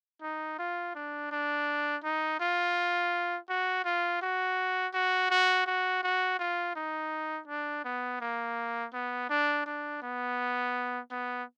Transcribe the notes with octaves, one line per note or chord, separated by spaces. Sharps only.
D#4
F4
D4
D4
D#4
F4
F#4
F4
F#4
F#4
F#4
F#4
F#4
F4
D#4
D4
B3
A#3
B3
D4
D4
B3
B3